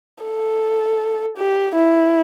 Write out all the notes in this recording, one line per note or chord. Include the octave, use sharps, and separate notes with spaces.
A4
G4
E4